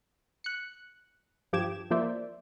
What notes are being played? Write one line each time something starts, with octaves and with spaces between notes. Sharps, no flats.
F#6 C#7
G2 F3 G4 D6 G#6 E7
F3 A#3 C5 D5 E5